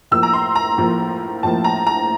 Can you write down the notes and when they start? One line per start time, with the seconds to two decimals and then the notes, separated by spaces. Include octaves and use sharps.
0.11 A2 F3 A#3 E6
0.23 A#5
0.33 C6
0.56 A#5
0.78 A2 F3 A#3
1.43 A2 F3 A#3 A5
1.64 A#5
1.87 A#5